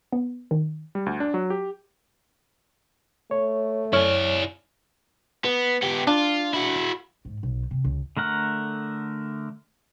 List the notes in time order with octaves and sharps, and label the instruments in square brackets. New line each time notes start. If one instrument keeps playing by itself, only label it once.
[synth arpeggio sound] B3
D#3
[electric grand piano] G3
D2
D4
F#3
G4
[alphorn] A3 [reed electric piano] C#5
[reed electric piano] F#2 C#5 F6 [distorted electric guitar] E4 D5
[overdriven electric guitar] B3
B3 G4
[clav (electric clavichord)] D4 [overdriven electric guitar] F4
[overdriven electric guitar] E4 F#4
[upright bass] G#2
B1
C3
C#2
[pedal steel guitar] D3 A3 A#4 F#5 F6